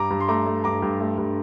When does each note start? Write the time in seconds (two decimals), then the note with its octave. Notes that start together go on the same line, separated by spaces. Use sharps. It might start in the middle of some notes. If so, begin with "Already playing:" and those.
Already playing: G2 A#5 D6
0.10 G2
0.20 C6
0.28 A3 A#5 D6
0.46 A3
0.64 G2 A#5 D6
0.82 G2
1.00 A3
1.18 G2